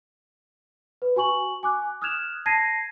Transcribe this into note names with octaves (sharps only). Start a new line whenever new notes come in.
B4
F#4 G#5 C#6 F#7
G#5 D6 F#6
D#6 F6 F#6 G#6 E7 F7
A5 G#6 A#6 C7 D#7